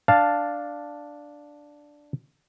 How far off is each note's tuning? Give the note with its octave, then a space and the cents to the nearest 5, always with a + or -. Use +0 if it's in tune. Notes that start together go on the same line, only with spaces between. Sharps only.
D4 +0 F5 +0 A5 +0